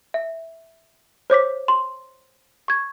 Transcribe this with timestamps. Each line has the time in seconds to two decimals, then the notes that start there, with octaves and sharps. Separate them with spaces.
0.14 E5
1.30 C5 C#5 D6 B6
1.68 C6
2.68 C#6 G#6